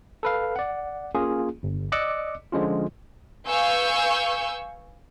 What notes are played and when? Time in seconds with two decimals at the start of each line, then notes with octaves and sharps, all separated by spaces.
0.23 A4 B4 F5
0.56 D5 F#5
1.15 A#3 C#4 F4 G#4
1.63 G1
1.92 D5 D#5 D6 E6 F#6 C#7
2.52 D3 F3 G#3 C#4 F4
3.46 B4 F5 G#5 C#6 E6 G6